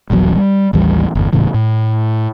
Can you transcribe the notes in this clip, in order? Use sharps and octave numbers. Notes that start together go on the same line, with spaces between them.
D#1 A#1 E2 F#3
G3
A1 D#2 E3 G3
G1 E2
D#1 A2 C#3 E3
A2